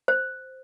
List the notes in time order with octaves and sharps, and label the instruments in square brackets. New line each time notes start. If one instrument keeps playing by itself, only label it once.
[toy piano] C5